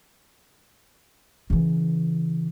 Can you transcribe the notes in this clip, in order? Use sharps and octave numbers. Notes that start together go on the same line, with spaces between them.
C#3 E3